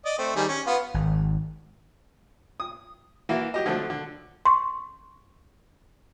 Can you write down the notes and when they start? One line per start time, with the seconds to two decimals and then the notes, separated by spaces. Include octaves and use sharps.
0.06 D5 D#5
0.18 A3 C4
0.36 D#3 G3 G#4
0.48 C#4
0.66 B3 F4
0.94 G#1
2.60 D#6
3.29 E3 A#3 F#4 E5
3.54 F#3 G4 D#5
3.66 D3 F3 F#3 A3 C4
3.90 D3
4.46 C6 C#6